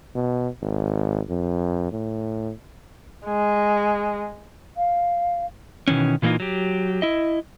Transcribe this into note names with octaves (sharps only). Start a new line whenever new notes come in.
B2
G#1
F2
A2
G#3
F5
B2 D#3 E3 C#4
A#2 E3 A3 A#3 D#4 F4
F#3 G4
E4 D#5